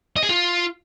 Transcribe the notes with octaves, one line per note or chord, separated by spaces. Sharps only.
D#5
G#4
F4